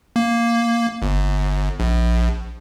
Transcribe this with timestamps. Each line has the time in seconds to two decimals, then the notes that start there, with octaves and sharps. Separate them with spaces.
0.16 A#3
1.02 G1
1.80 A#1